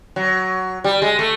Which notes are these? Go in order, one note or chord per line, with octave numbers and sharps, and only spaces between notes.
F#3
G3
G#3
A3